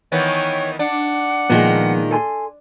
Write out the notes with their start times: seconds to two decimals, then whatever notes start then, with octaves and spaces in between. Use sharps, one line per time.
0.12 D#3 E3 B3 C#5
0.79 D4 F#5
1.50 A#2 D#3 F3 G#3 B3
2.11 A4 G#5 C6